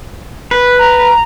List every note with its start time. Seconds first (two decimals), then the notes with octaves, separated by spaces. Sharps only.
0.51 B4
0.78 A#5